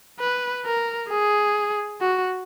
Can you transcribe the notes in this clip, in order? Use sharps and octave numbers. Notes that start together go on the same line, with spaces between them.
B4
A#4
G#4
F#4